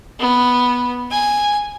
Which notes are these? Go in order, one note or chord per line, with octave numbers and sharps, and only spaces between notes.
B3
G#5